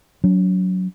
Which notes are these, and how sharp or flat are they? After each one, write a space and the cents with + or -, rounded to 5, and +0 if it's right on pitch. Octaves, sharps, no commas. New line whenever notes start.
F#3 +0 C#4 +45